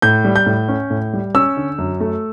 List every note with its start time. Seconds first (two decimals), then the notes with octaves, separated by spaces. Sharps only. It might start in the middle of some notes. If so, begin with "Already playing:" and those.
0.02 A2 G6
0.25 G3
0.36 G6
0.46 A2
0.68 C#4
0.90 A2
1.13 G3
1.35 C#4 E6
1.57 D3
1.78 F#2
2.00 A3